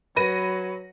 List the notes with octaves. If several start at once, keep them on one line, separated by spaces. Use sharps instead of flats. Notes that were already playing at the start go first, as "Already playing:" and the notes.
F#3 B4 A#6 D#7